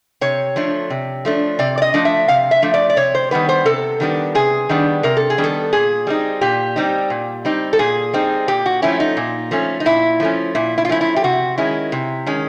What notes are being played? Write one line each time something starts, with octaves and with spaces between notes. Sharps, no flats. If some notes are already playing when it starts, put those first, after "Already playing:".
C3 C#5
F3 A3 D4
C3
F3 A3 D4
C3 D5
D5
D#5
F3 A3 D4
E5
C3 F5
E5
F3 A3 D4
D5
D5
C3 C#5
C5
D#3 G3 B3 D4 B4
C5
C3 A4
D#3 G3 B3 D4
C3 G#4
D#3 G3 B3 D4
C3 A#4
A4
G#4
D#3 G3 B3 D4
A4
A#2 G#4
G3 C4 D#4
A#2 G4
G3 C4 D#4
A#2
G3 C4 D#4
A4
A#2 G#4
G3 C4 D#4
A#2 G4
F#4
F3 A3 C#4 E4
D#4
A#2
F3 A3 C#4
D#4
A#2 E4
F3 A3 C#4
A#2 E4
E4
F4
F3 A3 C#4 E4
E4
G4
C3 F#4
D#3 G#3 C#4 E4
C3
D#3 G#3 C#4